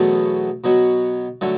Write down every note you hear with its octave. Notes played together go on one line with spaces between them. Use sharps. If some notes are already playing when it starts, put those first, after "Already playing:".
Already playing: E2 B2 F#3 A3 C#4
B2 F#3 C#4
D3 F#3 A3